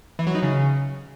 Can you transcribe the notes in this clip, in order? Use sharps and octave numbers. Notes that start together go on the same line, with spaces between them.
E3
F#3
D#4
C#3